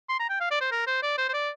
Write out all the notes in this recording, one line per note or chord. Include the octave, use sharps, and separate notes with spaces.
C6
A#5
G5
F5
D5
C5
A#4
C5
D5
C5
C5
D5